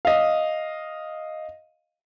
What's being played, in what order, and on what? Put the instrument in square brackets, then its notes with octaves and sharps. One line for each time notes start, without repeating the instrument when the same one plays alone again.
[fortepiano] D#5 F5